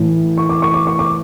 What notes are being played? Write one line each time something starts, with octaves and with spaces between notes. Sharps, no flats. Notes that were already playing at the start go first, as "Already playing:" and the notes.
Already playing: A2 E3 A3
C#6
D6
C#6
D6
C#6
D6